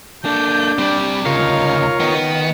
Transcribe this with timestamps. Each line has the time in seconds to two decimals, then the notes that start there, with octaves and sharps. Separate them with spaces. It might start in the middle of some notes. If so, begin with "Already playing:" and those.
0.25 A#3 D4 A4 G6
0.78 G3 C4 D5
1.25 D2 C#3 D#4 F4 A#4 C#5 F5
2.00 D#3 B3